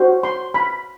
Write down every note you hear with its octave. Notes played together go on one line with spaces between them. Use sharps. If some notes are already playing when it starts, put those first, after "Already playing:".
Already playing: F#4 C5
C6
B5